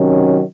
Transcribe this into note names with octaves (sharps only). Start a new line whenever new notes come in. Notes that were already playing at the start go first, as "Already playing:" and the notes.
Already playing: C3 D#3 F#3 C#4